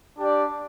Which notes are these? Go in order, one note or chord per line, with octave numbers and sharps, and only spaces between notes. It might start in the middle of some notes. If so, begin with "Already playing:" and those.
D4 G4 D5